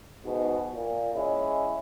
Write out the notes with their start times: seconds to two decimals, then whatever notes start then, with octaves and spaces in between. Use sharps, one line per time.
0.24 G#2 B2
0.73 A#2
1.14 G#3 C#4 E4